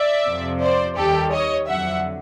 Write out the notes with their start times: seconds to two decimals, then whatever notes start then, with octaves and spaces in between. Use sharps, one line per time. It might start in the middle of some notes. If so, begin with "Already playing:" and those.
Already playing: D5 E5
0.27 F2 C3 F3
0.62 C5 D5
0.98 D#2 D#3 G3 G4 A4
1.33 C#5 D#5
1.68 F2 D3 F#3 E5 F#5